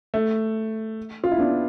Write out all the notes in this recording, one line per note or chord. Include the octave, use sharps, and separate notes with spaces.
A3
F4
E4
B3 D4